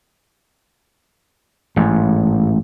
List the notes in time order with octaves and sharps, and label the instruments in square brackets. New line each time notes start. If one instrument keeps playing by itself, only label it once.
[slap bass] A1 G#2